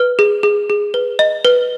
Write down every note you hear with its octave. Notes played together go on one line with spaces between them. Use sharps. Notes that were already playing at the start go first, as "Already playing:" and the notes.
Already playing: B4 F6
G#4
G#4
G#4
B4
D#5
B4